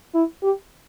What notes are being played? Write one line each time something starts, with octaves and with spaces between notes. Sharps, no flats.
E4
G4